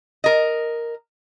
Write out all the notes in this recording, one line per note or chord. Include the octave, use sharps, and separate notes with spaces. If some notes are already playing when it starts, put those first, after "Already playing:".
A#4 D#5